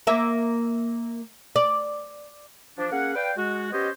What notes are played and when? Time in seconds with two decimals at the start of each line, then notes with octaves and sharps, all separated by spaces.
0.07 A#3 E5
1.56 D5
2.78 F3 D4
2.92 A#3 C#4 G#4 F#5
3.15 B4 D5 F5 G5
3.37 G#3 F#4
3.72 B3 C#4 G4 C5 C#5 D#5